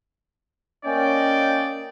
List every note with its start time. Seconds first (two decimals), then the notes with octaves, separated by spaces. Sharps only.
0.85 A#3 C#4 D5 D#5 G5